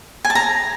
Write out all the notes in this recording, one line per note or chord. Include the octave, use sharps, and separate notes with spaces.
G#5
A5
A#5